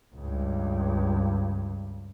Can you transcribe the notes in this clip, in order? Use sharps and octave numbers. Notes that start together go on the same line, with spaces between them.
C#2 G2